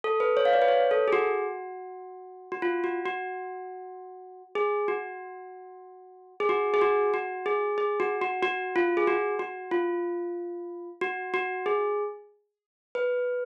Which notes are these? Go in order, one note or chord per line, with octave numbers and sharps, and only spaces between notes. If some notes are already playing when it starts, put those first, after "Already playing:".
A4
B4
C#5
F5
D5
B4
C#5
A4
G#4
F#4
F#4
F4
F#4
F#4
G#4
F#4
G#4
F#4
G#4
F#4
F#4
G#4
G#4
F#4
F#4
F#4
F4
G#4
F#4
F#4
F4
F#4
F#4
G#4
B4